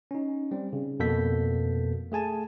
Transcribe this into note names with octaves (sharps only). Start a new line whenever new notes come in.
C#4 D#4
G3 C4
C#3
F2 B2 A#3 A4 G6 B6
A3 G#4 G#5 A5